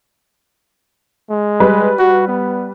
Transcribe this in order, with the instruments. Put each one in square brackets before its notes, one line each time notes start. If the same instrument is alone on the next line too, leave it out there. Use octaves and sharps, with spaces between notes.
[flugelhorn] G#3
[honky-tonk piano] G3 B4
[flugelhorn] F#4
B3